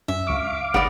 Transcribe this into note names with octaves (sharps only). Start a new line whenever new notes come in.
F#2 C#4 E5
C#2 F5 C#6 D6
G1 B3 D#4 G4 D5